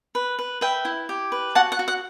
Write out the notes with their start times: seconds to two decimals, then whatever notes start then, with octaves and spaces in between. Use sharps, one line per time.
0.15 B4
0.39 B4
0.61 B4 E5 G5
0.85 E4
1.09 G4
1.32 B4
1.55 F#4 F#5 A5
1.72 F#5
1.79 F#4
1.88 F#5